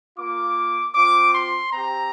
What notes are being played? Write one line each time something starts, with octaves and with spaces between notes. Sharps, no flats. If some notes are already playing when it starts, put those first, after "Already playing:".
A#3 F4 D6
C4 F4 D6
C6
C4 G4 A#5